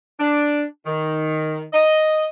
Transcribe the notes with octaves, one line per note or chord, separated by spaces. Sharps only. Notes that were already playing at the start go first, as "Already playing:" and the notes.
D4
D#3
D#5